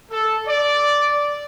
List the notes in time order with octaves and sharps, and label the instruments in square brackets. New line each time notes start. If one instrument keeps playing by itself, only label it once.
[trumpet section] A4
D5